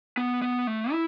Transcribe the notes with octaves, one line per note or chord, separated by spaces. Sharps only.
B3
B3
A3
E4